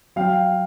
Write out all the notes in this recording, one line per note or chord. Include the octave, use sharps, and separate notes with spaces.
F#3 F5 G5